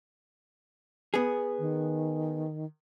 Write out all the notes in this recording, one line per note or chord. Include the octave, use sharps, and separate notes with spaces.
B3 G#4
D#3